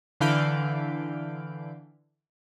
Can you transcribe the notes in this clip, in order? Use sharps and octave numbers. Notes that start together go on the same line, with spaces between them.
D3 E3 F5 B5 G6 D7